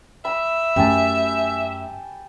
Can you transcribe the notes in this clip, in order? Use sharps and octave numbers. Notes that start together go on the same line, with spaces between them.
E5 B5
F#2 A3 G4 G#5 A5